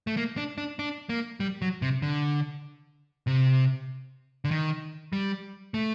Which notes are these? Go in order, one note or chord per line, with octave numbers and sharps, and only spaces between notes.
A3
A#3
D4
D4
D4
A#3
G3
F#3
C3
D3
C3
D3
D#3
G3
A3